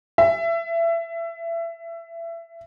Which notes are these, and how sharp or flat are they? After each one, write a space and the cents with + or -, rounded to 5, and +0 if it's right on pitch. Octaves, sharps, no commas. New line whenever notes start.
E5 +25